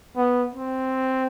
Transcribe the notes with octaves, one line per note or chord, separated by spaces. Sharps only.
B3
C4